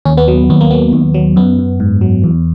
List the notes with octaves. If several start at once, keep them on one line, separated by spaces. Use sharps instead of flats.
D#2 C#4
B3
F#3
D#2 B3
A#3
F#3 B3
D#2
F#3
F#2 B3
F#2
G#2
F#3
E2